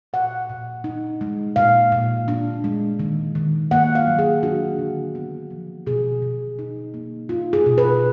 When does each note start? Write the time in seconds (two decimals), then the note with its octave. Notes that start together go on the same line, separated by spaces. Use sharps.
0.13 A#2 F#5
0.50 A#2
0.84 D#4
1.21 G#3
1.56 A#2 F5
1.92 A#2
2.28 D4
2.64 G#3
2.99 D#3
3.35 D#3
3.71 A#3 F#5
3.95 F5
4.07 F#3
4.19 G#4
4.43 D4 F#4
4.79 D3
5.15 B3
5.50 F3
5.87 B2 G#4
6.22 B2
6.59 D#4
6.94 A#3
7.29 D#4 F4
7.53 G#4
7.66 B2
7.78 B4